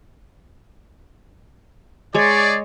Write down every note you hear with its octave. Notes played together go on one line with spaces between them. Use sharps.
G#3 G#4 C#5 D5